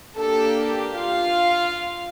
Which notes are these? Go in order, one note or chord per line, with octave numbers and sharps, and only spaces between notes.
A#3 D4 G4 A4 A5
F4 F5